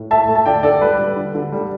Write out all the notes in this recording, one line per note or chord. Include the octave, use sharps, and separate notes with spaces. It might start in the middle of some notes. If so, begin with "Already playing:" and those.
Already playing: A2
A3 E5 A5
A3
A5
D3 D5 G5
D3 A4 D5
G3 B4
G3
D3
D3
G3